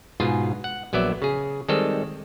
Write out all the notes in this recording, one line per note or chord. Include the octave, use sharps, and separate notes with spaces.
G#2 B2 F4 G#4
F#5
A#1 F#3 B3 D5 E5
C#3 G#4
D#3 G3 G#3 C4 A4 D#5